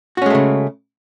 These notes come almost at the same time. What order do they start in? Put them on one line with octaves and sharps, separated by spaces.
F#4 C#4 G#3 A3 C#3